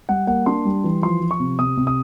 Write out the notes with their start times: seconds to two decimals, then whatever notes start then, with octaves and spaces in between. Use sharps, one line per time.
0.09 G3 F#5
0.27 A#3 F#5
0.46 D4 C6
0.65 G3
0.84 E3
1.02 F3 C6
1.21 F3
1.31 C#6
1.40 C3
1.59 C3 D#6
1.77 C3
1.87 D#6